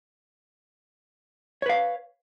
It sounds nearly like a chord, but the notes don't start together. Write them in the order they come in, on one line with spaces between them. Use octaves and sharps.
C#5 B4 F5